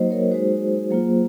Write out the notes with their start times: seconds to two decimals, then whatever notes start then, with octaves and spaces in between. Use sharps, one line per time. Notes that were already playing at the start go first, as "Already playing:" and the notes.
Already playing: F#3 A#3 D#4 F#4 C5 D#5
0.11 A#4 C#5
0.31 G#3 D#4 F#4 G#4 C5
0.90 F#3 A#3 F4